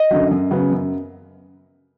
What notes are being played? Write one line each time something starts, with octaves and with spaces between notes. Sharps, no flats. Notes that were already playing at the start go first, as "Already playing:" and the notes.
Already playing: D#5
F#2 D3 F#3
F#2
C#3 F#3 B3
F#2